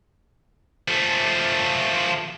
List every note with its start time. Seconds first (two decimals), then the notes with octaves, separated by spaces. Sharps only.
0.88 F3 A3